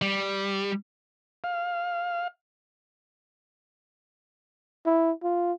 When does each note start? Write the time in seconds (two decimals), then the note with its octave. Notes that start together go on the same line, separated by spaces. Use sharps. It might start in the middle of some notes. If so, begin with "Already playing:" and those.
0.02 G3
1.44 F5
4.86 E4
5.23 F4